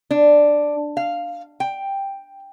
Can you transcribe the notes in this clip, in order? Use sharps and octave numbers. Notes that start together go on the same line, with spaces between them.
D4
F5
G5